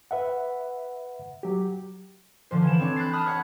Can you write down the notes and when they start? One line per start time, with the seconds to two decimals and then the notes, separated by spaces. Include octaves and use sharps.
0.11 B4 E5 F#5
1.43 F#3 G4
2.51 D3 F3 C5
2.63 E3 E7
2.80 C4 D4 C#5
2.96 B5 F#6 G6 A6 C7
3.13 A5 B5 D#6 F6 F#6
3.27 C#5 F#5